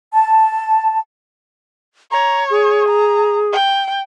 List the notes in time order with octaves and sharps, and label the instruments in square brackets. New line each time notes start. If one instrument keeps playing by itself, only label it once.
[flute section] A5
[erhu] C#5 [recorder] A#5
[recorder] G#4
[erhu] A#5
G5